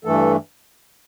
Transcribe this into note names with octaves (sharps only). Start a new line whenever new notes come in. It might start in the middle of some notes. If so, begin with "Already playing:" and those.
G2 E3 A3 A4